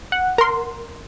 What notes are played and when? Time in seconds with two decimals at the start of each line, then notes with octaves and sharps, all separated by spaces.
0.12 F#5
0.38 A#4 C6